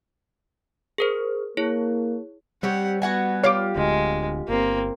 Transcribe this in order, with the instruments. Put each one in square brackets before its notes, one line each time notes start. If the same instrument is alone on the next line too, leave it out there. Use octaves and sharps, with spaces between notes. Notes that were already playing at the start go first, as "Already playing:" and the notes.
[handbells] G#4 A#4 C5
[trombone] A#3 [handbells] E4 G#4 C#5
[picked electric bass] G3 [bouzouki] C4 G4 C#5 [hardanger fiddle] F#5
[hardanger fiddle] B3 [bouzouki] F#4 F#5 G#5
[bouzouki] F4 G4 [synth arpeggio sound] C#5 F5 D6
[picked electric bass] D1 D2 D3 [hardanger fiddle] G#3
[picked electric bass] G1 [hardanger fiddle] A#3 C4